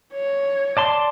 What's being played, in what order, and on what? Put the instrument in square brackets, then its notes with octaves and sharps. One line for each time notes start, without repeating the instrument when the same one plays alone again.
[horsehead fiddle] C#5
[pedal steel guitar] D5 A5 C6